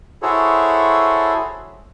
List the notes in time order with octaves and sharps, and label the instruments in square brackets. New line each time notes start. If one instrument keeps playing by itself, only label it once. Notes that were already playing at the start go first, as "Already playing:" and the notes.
[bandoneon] E4 F#4 G#4 A4 C5 C#5